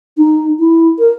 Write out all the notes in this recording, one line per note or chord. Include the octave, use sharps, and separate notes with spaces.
D#4
E4
A#4